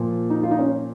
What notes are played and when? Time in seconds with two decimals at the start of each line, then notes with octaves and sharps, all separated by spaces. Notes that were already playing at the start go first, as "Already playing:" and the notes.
Already playing: A#2 F3
0.30 D#4
0.43 F4
0.51 D#4
0.59 C#4